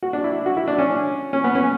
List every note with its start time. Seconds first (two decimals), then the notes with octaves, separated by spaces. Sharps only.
0.03 F#4
0.13 D4
0.24 E4
0.46 F#4
0.57 E4
0.68 D4
0.79 C#4
1.33 C#4
1.44 B3
1.55 C#4